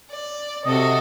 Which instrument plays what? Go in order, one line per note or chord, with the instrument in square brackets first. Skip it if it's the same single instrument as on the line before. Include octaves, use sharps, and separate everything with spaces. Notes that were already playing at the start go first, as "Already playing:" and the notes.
[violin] D5
[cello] C3 [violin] F#4 A4 [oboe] D#5